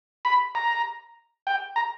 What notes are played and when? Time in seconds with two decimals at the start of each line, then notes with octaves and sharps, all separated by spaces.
0.25 B5
0.55 A#5
1.47 G5
1.76 A#5